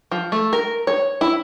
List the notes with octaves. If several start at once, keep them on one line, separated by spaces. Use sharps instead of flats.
F3
A3
A#4
C#5
E4